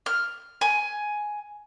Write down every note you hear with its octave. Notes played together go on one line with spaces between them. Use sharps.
F6
G#5